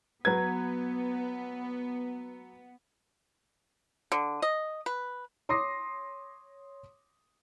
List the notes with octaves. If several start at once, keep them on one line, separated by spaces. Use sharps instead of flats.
F#3 B3 B4 G#6
D3
D#5
B4
C#5 C6 D6 D#6 A#6 C7